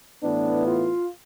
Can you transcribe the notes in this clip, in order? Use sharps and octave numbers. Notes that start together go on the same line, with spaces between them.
A2 E3 B3 D4
F4